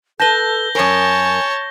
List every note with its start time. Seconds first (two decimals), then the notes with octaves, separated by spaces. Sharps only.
0.20 A4 B4 A5 G6 A#6 G7
0.75 F#2 A#4 C#5 G#5 A5